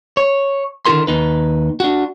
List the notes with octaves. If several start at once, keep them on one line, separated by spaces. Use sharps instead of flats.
C#5
D3 D#3 E4 F#4 A#4 C6
D#2 D#4 B4
D4 F#4